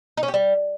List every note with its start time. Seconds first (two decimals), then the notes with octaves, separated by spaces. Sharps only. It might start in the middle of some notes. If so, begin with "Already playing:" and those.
0.17 D#4
0.23 C#4
0.28 G4
0.34 G3